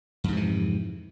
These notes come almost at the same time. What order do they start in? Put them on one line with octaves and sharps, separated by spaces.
F2 G#2 C3 E3